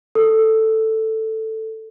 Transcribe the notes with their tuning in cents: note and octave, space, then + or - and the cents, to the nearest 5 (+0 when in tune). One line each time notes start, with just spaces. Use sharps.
A4 +5